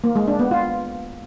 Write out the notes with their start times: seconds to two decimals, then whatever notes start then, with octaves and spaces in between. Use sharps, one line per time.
0.04 A#3
0.16 G#3
0.27 D4
0.39 B3
0.51 F4